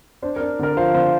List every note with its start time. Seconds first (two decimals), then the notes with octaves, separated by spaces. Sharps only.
0.22 D4 C5
0.36 A#4
0.40 D4
0.59 D3 A#4 D5
0.77 F3 C5 F5
0.94 D3 C5 F5